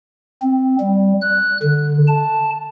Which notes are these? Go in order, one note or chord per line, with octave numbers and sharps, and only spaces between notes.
C4
G3
F#6
D3
A5